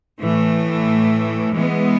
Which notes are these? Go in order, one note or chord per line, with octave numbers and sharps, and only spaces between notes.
A2 E3 A3
E3 G#3 B3